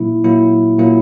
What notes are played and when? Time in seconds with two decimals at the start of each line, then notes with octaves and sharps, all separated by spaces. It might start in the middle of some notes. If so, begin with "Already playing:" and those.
Already playing: A#2 F#3 A#3 E4
0.24 A#2 F#3 A#3 E4
0.78 A#2 F#3 A#3 E4